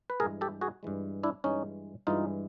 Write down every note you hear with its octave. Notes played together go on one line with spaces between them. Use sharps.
B4
G2 E3 G#3 G#4 A#4
G4 A4
F#4 G#4
G2 E3 G#3
D4 E4
G2 E3 G#3 C#4 D#4
G2 E3 G#3 D#4 F4